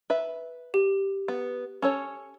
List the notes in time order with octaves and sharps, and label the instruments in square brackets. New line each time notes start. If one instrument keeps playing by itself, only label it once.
[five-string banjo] B4 E5
[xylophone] G4
[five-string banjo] B3
C#4 A4 C#5